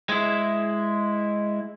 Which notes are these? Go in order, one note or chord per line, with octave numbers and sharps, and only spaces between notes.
G#3 E4